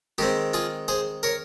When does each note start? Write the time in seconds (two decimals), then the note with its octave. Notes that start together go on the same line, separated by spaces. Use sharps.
0.18 D#3 G#3 C4 G4
0.53 F4 G#4
0.88 G#4 C5
1.23 A#4 C#5